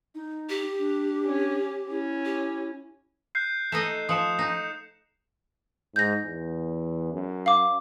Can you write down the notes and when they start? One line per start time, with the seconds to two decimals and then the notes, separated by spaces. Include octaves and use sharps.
0.15 D#4
0.49 G4
0.79 D4
1.26 C#4
1.90 C#4 E4
2.25 G4
3.35 F#6 G6 C7
3.72 A3 D#4 D#5 E7
4.09 F3 D#6 C#7 E7
4.39 D#4
5.96 G#2 G6 A#6
6.24 E2
7.13 F#2
7.46 F5 D6